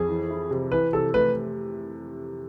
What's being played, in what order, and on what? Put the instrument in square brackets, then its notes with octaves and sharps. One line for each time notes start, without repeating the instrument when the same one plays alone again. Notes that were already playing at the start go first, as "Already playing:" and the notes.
Already playing: [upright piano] F2 [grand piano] G#4
[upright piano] E3
E4
C3
[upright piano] E3 [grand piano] B4
[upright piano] C3 [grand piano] A4
[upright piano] A3 [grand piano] B4